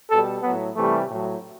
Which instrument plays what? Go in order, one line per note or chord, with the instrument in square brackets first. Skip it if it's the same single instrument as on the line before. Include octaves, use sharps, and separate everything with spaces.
[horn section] B2 G3 A4
A2 F#3 B3
C3 E3 G3 A3
A2 F#3